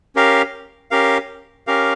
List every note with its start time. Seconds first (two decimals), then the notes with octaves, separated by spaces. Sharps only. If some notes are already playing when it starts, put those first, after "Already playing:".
0.16 C#4 G4 A#4 F5
0.91 C#4 G4 A#4 F5
1.67 C#4 G4 A#4 F5